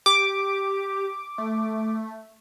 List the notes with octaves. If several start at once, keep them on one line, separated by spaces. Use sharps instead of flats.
G4 D6
A3